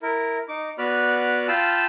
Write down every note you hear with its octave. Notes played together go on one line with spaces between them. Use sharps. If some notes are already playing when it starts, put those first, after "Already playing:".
E4 A#4
D#4 D6
B3 F#4 B4 D5 B5 F6
F4 F5 G5 A5 B5 E6